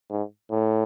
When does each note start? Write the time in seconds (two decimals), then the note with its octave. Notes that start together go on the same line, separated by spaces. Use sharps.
0.10 G#2
0.51 A2